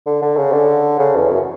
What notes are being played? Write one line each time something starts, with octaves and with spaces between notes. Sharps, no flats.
D3
D3
C#3
D3
C#3
E2
F#2